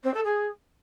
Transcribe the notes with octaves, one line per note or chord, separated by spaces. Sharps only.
C4
A4
G#4